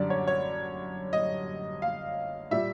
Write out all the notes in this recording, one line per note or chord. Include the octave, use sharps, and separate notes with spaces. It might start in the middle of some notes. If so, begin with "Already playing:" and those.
Already playing: F#2 D3 G3 D5
C#5
C#5
D#5
F5
A#2 G3 E5